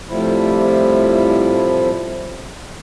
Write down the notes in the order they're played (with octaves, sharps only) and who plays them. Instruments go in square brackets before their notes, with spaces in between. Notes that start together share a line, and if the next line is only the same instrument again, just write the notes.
[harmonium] A2 C3 F3 G3 E4